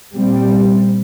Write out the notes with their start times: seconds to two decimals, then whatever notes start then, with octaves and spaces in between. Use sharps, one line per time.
0.15 A#2 G3 C4